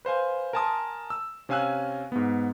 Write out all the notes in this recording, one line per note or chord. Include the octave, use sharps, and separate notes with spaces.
B4 C5 F5 G#5
A#4 G#5 A5 C6 D#6
E6
C3 C#4 F5 G#5 E6 F#6
G#2 B3